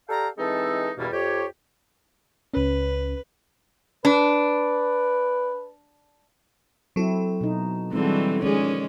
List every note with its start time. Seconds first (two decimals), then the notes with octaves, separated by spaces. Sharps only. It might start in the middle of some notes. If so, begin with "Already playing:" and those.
0.09 G4 A4 D5 F5 G5 A#5
0.38 E3 G#3 C4 D#4 A4
0.98 E2 G2 B2 G3 A#3 E4
1.12 F2 G4 C#5
2.54 C#2 C#4 B4
4.05 D4 B4
6.96 F#3 C4 E4 A4
7.41 B2 D#4
7.93 D3 E3 G3 G#3 C4 D4 F#4
8.43 D#3 F3 G#3 C#4 G#4 D5